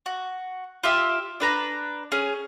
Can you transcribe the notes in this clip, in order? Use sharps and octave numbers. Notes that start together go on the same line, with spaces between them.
F#4
F4 G4 E5
D4 B4 A#5
C#4 G#4